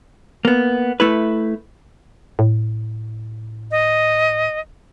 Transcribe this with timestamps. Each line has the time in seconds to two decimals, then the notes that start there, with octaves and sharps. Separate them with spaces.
0.45 A#3 B3
1.00 A3 E4 B4
2.39 A2
3.71 D#5